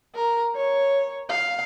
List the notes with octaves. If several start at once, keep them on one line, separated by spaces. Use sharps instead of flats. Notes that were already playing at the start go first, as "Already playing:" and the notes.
A#4
C#5
F5